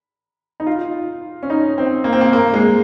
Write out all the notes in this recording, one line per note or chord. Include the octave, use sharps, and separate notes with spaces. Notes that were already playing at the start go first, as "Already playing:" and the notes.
D#4
F4
C#4
D#4
C4
A#3
C4
A#3
A#3
G#3